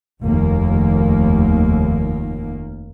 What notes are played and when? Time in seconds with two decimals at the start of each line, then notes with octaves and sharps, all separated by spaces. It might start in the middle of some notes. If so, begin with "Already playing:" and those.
0.23 F1 D#2 A#3